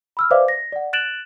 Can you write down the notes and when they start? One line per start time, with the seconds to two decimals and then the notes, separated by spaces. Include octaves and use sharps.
0.17 B5 E6 F6
0.31 B4 C5 D5 E5 F5 D6
0.48 A#6
0.72 D5 F#5
0.93 F#6 A6 D7 E7 F#7